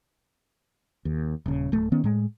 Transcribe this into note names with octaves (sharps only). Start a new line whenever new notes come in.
D#2
D#1 C#3
D1 A3
D#3 B3 C#4
A2 G#3